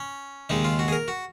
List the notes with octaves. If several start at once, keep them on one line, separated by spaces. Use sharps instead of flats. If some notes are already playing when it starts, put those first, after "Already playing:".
Already playing: C#4
D#2 C#3 G#3 D#4
F4
F#4
G#4
A#4
F#4